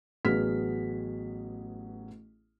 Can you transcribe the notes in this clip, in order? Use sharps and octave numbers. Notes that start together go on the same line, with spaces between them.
A1 F#3 B3 G#4 F6 B6